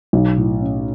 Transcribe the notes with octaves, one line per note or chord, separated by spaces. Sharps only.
B1
A2
C#4